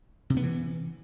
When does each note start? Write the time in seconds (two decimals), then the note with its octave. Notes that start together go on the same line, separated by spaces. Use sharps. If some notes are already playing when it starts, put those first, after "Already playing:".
0.30 C3
0.37 B3
0.43 E3